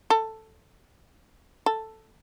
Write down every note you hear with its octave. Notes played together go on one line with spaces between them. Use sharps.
A4
A4